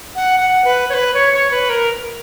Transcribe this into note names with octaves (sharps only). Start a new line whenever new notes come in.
F#5
F#5
B4
C#5
B4
C#5
C#5
B4
A#4